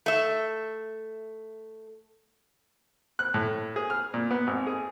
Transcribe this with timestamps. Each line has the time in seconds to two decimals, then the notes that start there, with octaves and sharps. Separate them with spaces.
0.06 A3 E5
3.19 F#6
3.34 A2
3.76 G#4
3.90 F6
4.14 A#2
4.31 B3
4.47 G#1
4.67 G#4